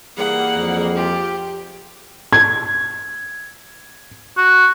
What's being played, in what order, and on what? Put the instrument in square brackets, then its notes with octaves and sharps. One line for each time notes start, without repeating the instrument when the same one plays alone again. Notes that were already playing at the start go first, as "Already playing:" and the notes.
[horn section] E3 G3 A#3 [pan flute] G#4 [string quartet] F#5
[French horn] F2
[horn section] C4 F4 [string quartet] G4
[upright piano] G#6
[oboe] F#4